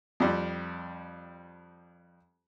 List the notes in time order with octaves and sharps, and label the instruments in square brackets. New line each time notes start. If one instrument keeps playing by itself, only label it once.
[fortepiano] F2 G3